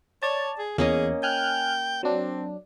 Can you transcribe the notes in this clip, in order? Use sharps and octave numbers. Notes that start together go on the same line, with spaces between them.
C#5 D5 A5
G#4
E2 A#3 C#4 G#4 D#5
G5 G#5 F6 F#6
F#3 C4 D4